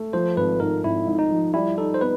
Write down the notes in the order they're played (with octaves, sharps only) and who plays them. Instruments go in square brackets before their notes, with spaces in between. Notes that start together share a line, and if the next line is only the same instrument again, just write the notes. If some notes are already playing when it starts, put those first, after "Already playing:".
Already playing: [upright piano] A3
[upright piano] F3 [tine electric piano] C5
[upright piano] G#1 [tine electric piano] B4
[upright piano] G#2 [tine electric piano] A#4
[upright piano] G#1 [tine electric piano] E4
[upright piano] G#2
[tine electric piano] D#4
[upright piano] F3
[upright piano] G3 [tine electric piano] E4
[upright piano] D#4 [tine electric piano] A4
[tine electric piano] C5
[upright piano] B3 [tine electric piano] B4